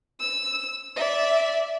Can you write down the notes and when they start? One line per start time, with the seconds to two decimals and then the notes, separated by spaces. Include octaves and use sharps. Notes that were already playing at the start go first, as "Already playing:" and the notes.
0.20 E6
0.96 D5 E5